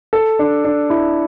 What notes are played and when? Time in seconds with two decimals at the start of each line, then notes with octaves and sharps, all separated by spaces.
0.13 A4
0.39 D4
0.65 D4
0.90 E4